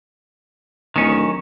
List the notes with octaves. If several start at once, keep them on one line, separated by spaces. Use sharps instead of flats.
D1 D#3 C#4